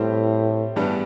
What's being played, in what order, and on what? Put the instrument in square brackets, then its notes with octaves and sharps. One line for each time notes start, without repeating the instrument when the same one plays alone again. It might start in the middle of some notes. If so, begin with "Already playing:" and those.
Already playing: [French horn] A2 [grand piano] G3 C4 G4 C5
[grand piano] G2 E3 G3 B3 D4